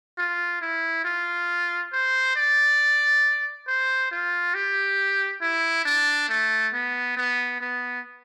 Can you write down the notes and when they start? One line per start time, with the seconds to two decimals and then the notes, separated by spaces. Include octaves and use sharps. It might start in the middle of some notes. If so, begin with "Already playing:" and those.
0.18 F4
0.61 E4
1.05 F4
1.92 C5
2.36 D5
3.67 C5
4.11 F4
4.54 G4
5.41 E4
5.85 D4
6.29 A3
6.73 B3
7.17 B3
7.60 B3